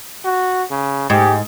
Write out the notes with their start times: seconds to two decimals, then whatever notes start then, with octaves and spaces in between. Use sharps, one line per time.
0.25 F#4
0.71 C#3
1.10 G#2 G4